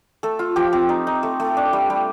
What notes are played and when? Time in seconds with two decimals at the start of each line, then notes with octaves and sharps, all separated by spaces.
0.23 A3 A4
0.39 F4
0.56 F3 G4
0.73 C4
0.89 D#4
1.07 D#4
1.23 A3
1.40 A3
1.57 D4
1.73 G3
1.90 G3